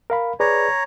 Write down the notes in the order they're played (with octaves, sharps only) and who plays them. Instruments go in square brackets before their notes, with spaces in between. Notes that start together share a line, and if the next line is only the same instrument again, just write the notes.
[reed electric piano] A#4 F5 B5
[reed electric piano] G#4 B4 D5 [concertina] C#5 A#5